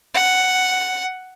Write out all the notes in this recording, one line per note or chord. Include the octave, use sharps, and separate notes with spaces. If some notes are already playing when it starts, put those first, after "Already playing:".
F#5